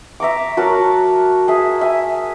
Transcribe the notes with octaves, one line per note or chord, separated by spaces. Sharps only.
E5 A#5 C#6 D6
F#3 F#4 A#4 A5
G#4 E5
E5 G#5